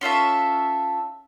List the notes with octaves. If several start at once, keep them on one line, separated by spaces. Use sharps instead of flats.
C#4 F4 A4 E5